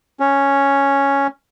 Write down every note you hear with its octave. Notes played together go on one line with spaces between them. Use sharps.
C#4